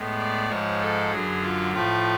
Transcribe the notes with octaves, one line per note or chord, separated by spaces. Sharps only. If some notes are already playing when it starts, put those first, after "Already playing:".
Already playing: A2 G#3 B3
D5
G#2 F3 G#3 C#5
A4
F#2 D3 F#3 G#4
F4
A2 F3 A3 F4